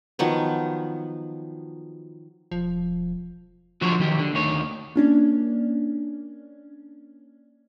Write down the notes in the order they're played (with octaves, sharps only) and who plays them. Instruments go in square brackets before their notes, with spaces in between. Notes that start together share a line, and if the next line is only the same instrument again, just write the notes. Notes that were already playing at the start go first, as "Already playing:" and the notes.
[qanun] D#3 F3 F#3 B3
[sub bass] E1 [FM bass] F3
[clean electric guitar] D3 F3 F#3 F#4 C5 C#5
D#3 F#3 G4
D3
D2 D#3 C#5
[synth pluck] A#3 C#4 D4